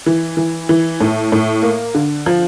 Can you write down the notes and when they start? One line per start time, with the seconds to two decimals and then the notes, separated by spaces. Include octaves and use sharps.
0.06 E3
0.37 E3
0.69 E3
1.00 A2
1.32 A2
1.62 A#3
1.94 D3
2.26 F3